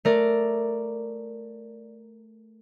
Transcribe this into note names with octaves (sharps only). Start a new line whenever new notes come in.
A3 A#4 D5